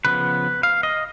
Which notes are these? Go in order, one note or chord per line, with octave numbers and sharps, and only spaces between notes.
C#3 F3 B3 B4
F5
D#5